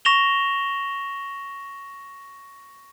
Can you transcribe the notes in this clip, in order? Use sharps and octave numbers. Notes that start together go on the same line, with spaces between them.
C#6 A#6 E7 F7 G7